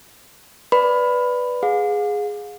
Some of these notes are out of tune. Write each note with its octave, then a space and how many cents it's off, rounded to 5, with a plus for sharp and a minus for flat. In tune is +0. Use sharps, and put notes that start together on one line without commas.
B4 +0 D5 +0 B5 +10
G#4 +0 F5 +40